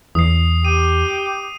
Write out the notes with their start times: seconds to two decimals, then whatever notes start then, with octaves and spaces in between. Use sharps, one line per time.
0.15 E2 D#6 C7
0.65 G4 D#7